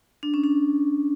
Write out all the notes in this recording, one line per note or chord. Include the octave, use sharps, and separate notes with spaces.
D4
C#4
D4